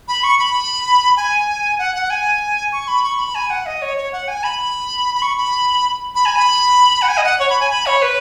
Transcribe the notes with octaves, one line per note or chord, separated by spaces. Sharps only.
B5
C#6
B5
G#5
F#5
F#5
G#5
C#6
B5
C#6
B5
G#5
F#5
D#5
C#5
C#5
F#5
G#5
B5
B5
C#6
B5
B5
G#5
B5
F#5
G#5
D#5
F#5
C#5
B5
G#5
B5
C#5
B4